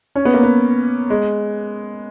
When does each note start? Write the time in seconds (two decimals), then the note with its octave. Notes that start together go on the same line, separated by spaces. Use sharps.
0.15 C#4
0.25 B3
0.34 A#3
0.43 B3
1.10 G#3